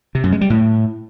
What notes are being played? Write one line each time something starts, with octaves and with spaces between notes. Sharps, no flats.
C3
F#2
G#3
G3
A2